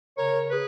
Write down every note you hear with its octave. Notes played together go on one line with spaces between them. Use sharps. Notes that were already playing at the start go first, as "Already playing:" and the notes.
C#3 A#4 C#5
G#4 B4